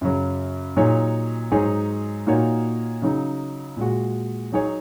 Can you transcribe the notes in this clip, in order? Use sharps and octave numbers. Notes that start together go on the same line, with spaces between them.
F#2 C#3 F#3
A#2 F#3 D#4 G#4 C#5
G#2 F#3 D#4 G#4 C#5
A#2 A#3 D#4 F#4 C#5
C#3 F#3 D#4
A#2 G#3 F#4
F#3 D#4 G#4 C#5